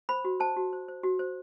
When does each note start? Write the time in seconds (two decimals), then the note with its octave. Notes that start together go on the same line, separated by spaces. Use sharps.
0.09 C5 B5
0.25 F#4
0.40 C5 A5
0.56 F#4
0.73 C5
0.88 C5
1.03 F#4
1.19 C5